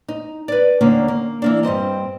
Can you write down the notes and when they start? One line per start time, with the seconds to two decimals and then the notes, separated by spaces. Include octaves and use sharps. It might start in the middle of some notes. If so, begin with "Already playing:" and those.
0.08 D#4
0.48 B4 D5
0.81 D#2 D3 A#3 C#4
1.08 A#3
1.42 E3 A#3 D4
1.63 G2 B2 C4 D#5